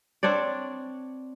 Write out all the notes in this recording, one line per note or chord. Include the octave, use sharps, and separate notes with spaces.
C4 D4 C#5 D5